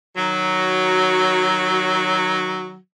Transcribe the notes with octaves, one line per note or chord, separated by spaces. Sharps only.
D#3 F#3